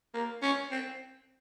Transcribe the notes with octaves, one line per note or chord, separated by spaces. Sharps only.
A#3
C#4
C4